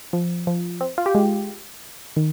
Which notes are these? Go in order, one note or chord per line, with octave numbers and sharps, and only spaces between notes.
F3
F3
C4
F4
G4
G#3
D#3